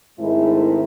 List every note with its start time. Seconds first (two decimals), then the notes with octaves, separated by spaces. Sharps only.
0.18 G#2 D#3 G#3 A3 C4 E4